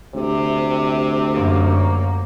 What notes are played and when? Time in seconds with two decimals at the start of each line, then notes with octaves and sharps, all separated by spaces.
0.14 D2 C3
1.34 F#2 A#3